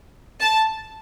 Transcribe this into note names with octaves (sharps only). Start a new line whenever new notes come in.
A5